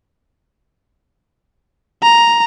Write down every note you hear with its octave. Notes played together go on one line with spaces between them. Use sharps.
A#5